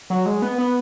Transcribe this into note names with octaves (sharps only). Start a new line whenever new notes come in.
F#3
G#3
B3
B3